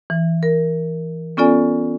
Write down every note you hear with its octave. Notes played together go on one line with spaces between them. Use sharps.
E3
A#4
B3 C#4 F4 A4 D5 G#5